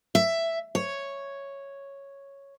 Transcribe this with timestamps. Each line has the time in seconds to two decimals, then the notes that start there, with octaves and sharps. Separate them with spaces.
0.15 E5
0.75 C#5